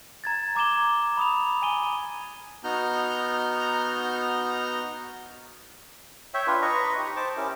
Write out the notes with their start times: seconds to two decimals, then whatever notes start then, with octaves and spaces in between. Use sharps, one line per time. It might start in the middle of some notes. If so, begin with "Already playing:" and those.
0.24 A#5 G#6 A6
0.55 A#5 D6 G#6 E7 G7
1.17 B5 D#6 F7
1.62 G#5 D#7 G7
2.64 B3 D#4 F#4 A#5 F6 G6
6.34 C#5 E5 G5
6.47 D4 F4 B4
6.62 B4 D#5 A#5 C#6
6.98 D#4 G4
7.16 C5 A5 D6
7.37 C#4 E4 G4 A#4